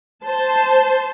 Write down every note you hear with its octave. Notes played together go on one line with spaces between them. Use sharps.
C5 A5